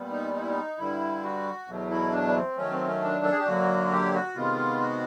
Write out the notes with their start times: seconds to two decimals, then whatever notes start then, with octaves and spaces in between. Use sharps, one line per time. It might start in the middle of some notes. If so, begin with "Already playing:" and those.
Already playing: A#2 G3 B3
0.11 D#4
0.34 D#4
0.41 E4
0.49 D#4
0.78 G2 D3 G3 E4
1.23 F#4
1.67 E2 B2 F#3 A3
1.90 E4
2.12 D4
2.27 B3
2.35 C4
2.56 F#2 D#3 F#3 A3 C#4
2.72 C4
2.87 C#4
3.01 D4
3.24 A4
3.31 G#4
3.39 G4
3.46 F#2 D3 F#3 A#3 F#4
3.91 G4
4.14 F#4
4.35 C3 D#3 G#3 B3 F4
4.81 F#4